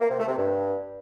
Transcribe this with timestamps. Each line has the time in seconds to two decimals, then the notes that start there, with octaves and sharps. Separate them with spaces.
0.01 A#3
0.10 C3
0.19 A3
0.28 C3
0.37 G2